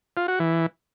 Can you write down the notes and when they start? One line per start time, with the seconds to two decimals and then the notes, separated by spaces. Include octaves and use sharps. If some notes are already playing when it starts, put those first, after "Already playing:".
0.17 F4
0.28 F#4
0.40 E3